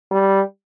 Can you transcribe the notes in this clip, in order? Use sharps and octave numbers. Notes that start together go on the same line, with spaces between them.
G3